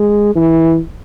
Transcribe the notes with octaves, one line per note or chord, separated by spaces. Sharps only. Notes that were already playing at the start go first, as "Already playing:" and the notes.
Already playing: G#3
E3